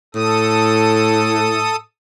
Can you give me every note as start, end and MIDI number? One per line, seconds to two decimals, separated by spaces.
0.14 1.81 45
0.14 1.76 69
0.14 1.76 87